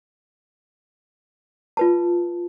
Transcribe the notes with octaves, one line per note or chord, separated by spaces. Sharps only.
F4 B4 A5